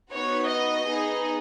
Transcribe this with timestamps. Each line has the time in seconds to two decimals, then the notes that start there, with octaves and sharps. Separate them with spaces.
0.12 B3 D#4 F#4 C#5
0.49 D#5
0.86 B3 D#4 G#4